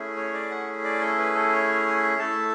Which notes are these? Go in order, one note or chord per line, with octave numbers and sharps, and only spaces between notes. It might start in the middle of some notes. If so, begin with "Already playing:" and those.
Already playing: A3 C#4 E4 G#4
C#5
D5
F#5
D5
A4
B4
A4
C#5
A3 E4 A4 A5